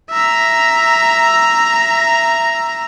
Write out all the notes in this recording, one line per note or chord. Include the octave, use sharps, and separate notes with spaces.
E5 A#5